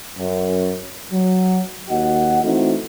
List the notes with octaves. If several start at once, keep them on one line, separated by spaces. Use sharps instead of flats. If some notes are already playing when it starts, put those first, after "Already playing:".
F#2
F#3
D#2 F#4 D#5 F#5
E3 A3 C4 D#4 E4 F#4